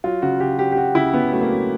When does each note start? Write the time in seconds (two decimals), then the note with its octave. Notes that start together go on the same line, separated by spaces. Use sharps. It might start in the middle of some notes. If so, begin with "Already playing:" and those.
0.04 F#3 F4
0.22 C#3 F#4
0.40 C#3 G4
0.59 F#3 G4
0.72 G4
0.77 F#3 F#4
0.95 C#3 E4
1.14 C#3 B3
1.32 F#3 A3
1.41 A#3
1.50 F#3